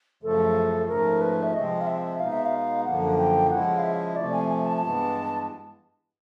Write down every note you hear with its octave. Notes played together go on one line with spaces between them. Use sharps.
F#2 C#3 F3 A3 A4
G#2 F3 A3 C#4 A#4
B4
E5
C3 F3 G#3 C4 D#5
F5
E5
B2 G#3 B3 D#4 F5
E5
F5
F#2 D3 F3 A#3 F#5
G5
C#3 F3 G#3 C#4 E4 F#5
F5
E5
C3 F3 A3 D5
G#5
G#5
A5
G2 E3 G#3 B3